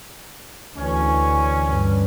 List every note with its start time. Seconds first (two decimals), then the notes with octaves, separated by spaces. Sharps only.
0.77 D2 E3 C#4
1.66 G2